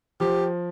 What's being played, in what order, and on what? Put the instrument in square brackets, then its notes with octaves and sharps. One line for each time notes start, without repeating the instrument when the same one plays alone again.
[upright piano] F3 [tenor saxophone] G4